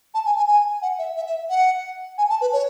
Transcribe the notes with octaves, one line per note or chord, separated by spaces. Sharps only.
A5
G#5
G#5
G#5
F#5
E5
E5
E5
F#5
G#5
A5
B4
C#5